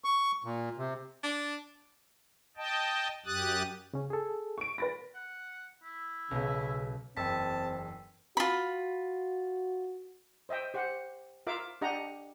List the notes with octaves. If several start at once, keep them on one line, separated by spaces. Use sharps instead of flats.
C#6
A#2
C3
D4
D#5 G5 A5
F#2 G4 D#6 F#6 A6
C#3 C#4
G#4 A4
C#6 D7
B4 B5 A6 A#6
F#5
E4
B1 C#3 B3
F#1 E2 C4 G5 A5 E6 B6
F4 F#4 B5
C5 D#5 E5 G5
G4 C5 F#5
F4 A#4 E5 F5 D6
D4 G4 D#5 F#5 A#5